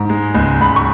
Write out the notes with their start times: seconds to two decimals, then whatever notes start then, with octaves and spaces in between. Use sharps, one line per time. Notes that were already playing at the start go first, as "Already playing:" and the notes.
Already playing: G#2
0.09 G#3
0.35 C#2
0.61 C#2 B5
0.76 C#6